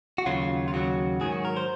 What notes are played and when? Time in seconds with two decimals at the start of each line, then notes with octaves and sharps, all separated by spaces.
0.18 F#4
0.26 D#2 C#3 F#3 F4
0.68 F4
0.73 D#2 C#3 F#3 F#4
1.21 G#2 D#3 F#3 G#4
1.32 F#4
1.45 A#4
1.57 C5